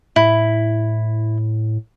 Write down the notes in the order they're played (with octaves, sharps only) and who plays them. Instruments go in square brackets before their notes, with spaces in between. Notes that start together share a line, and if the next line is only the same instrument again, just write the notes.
[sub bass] A2 [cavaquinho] E4